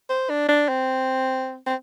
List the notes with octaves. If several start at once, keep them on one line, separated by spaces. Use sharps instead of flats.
C5
D4
D4
C4
C4